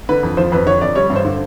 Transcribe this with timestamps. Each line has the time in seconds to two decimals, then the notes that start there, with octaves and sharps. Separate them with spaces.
0.09 D3 B4
0.23 F2
0.37 F3 C5
0.52 F2 B4
0.66 D3 C#5
0.81 F2 D5
0.96 G3 C#5
1.10 G2
1.16 C5
1.25 D3